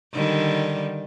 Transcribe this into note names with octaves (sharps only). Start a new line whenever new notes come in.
D3 D#3 G3